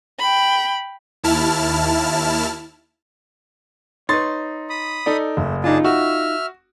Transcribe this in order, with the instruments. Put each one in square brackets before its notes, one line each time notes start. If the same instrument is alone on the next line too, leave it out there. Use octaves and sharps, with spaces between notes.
[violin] G5 B5
[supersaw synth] D#2 E4 A5 F6
[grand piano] D#4 C6 A6 [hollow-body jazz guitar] B4 C#5
[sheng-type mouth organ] B5 D#6
[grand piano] D#4 A4 D5
[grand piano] F#1 [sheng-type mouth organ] A3
[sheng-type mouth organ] D4 G#4 A5 [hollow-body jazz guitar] D#4 F4
[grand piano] F#4 [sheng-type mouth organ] E5 F6